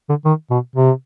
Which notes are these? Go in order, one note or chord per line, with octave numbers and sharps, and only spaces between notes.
D3
D#3
B2
C3